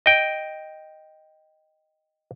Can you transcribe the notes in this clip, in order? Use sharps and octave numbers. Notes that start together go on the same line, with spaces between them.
D#5 G5